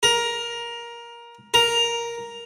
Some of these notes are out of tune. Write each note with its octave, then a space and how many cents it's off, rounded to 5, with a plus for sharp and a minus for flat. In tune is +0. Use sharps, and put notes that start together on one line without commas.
A#4 +15
A#4 +5